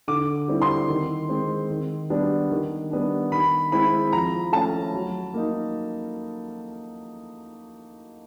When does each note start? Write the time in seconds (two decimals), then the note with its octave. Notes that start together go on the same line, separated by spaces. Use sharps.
0.08 D3 D6
0.48 G3 C4 E4
0.62 C6
0.89 D#3
1.29 G#3 C4
1.70 D#3
2.10 G3 B3 D4
2.51 D#3
2.91 G3 B3 D4
3.31 D#3 B5
3.72 G#3 C4 E4 B5
4.13 F3 A#5
4.52 A3 C#4 A5
4.93 F#3
5.34 A#3 D#4